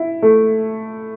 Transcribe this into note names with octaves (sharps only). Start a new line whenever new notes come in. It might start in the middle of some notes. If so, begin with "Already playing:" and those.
Already playing: E4
A3